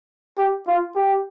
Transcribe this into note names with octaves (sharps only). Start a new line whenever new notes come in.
G4
F4
G4